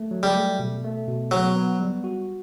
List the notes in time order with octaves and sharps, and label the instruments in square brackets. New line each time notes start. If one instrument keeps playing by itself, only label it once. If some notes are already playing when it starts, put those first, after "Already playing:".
Already playing: [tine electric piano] A3
F#3
[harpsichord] G3
[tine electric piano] A3
B2
A3
B2
[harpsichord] F#3 [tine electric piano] B3
[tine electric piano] B3
G3
F#4